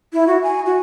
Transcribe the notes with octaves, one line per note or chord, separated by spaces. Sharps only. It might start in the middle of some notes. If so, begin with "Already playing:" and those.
E4
F#4
G#5
F#4